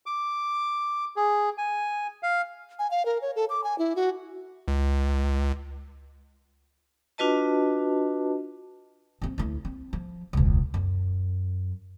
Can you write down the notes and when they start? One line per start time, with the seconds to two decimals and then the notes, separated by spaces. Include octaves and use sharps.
0.06 D6
1.16 G#4
1.58 G#5
2.23 F5
2.79 G#5
2.91 F5
3.06 A#4
3.22 C#5
3.36 A4
3.50 D6
3.64 G#5
3.78 E4
3.96 F#4
4.68 C#2
7.18 D4 F4 F#4 B4 D#5 A5
9.22 F3 C4
9.38 D2 E4
9.65 C4
9.93 F3
10.33 E1 C#2
10.74 F#2